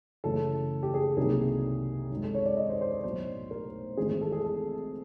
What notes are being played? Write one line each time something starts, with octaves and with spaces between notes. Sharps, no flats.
F#2 C#3 E3 A3 A4
G4
G#4
C2 C3 D#3 F#3 A#3 G#4
F#2 D#3 G#3
A4
C#5
D5
D#5
C5
C5
C5
B1 A2 F#3 A3 C5
A#4
G#1 G#2 E3 A3 G#4
G#4
A4
G#4
A4